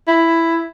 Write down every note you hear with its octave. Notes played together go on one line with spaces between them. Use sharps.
E4